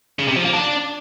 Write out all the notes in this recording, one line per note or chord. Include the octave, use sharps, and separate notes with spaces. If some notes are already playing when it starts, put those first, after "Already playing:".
C#3
C3
F3
A#3
D4